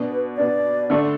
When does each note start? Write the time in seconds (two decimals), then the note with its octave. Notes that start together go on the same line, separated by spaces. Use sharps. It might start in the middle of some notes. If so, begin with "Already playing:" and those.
Already playing: B2 B3 D4
0.11 B4
0.37 B2 B3 D4 D5
0.90 D3 A3 D4 A4